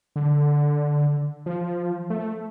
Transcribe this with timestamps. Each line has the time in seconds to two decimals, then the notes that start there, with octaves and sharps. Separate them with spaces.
0.16 D3
1.46 F3
2.10 A3